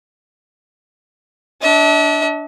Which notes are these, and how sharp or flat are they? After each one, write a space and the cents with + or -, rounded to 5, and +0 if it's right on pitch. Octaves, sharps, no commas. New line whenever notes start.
D4 -10 E5 -45